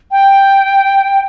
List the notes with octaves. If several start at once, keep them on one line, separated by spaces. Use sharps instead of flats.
G5